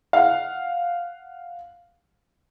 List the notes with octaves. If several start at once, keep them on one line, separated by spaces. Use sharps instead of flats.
F5 F#5